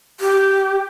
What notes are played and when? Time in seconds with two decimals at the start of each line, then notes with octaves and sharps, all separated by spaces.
0.20 G4